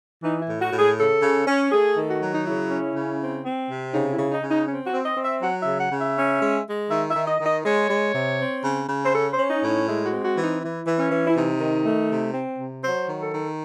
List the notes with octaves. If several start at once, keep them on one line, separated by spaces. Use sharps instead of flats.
E3 D#4
E4
A2
F#4
A2
G#4
C#3 A4
C#3
C#4
A3 G#4
D#3
F#4
F#3
D#4
C#3 E4
C#4
C#3
C4
C4
C3
C#3 D#4
E4
C#3
D#4
C#3
D#4
C4 C#4
F#4
C4
D#5
C4
E5
F#3 F#5
E5
C#3
F#5
C#3
E5
C#4
G#3
G#3
D#3 E5
E5
D#3
D#5
D#3
D#5
G#3 C#5
G#3
C3
C4
C#3
C#3
C5
C#4 A4
C5
C#4
D#4
A2
D#4
G#3 E4
F#4
C4
F#4
E3
D#4
E3 E4
E3
C#4
E3
E4
C3 D#4
D#3
A3
C3
C4
C3
F#3 C5
D#3
A4
D#3